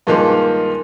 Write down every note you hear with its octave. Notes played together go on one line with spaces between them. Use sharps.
G2 D#3 F3 G#3 A#3